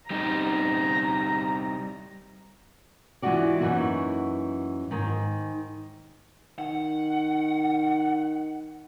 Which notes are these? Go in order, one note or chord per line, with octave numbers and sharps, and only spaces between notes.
G3 C4 D#4 A#5
E3 G#3 D4 F4 F#4 D5
F#2 E3 G3 A#3 D#4 F#4
G#2 D#3
D#3 F#5